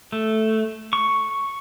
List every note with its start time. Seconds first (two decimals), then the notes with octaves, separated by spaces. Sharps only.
0.12 A3
0.93 C#6